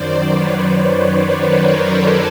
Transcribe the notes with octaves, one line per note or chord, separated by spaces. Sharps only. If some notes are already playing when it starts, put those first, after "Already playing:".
Already playing: F#2 D#3 F#3 C5 D5
B4 C#5
C5 D5
B4 C#5
A#4 C5
A4 B4